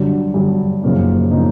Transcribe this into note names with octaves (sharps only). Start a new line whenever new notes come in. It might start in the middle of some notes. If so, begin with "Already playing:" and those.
Already playing: G2 D3 F#3
G2 D3 F#3
F#2 C#3 F3 A#3 D#4
C#3 F3 A#3 D#4